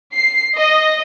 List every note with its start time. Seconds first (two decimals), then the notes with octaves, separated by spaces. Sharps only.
0.13 C7
0.57 D#5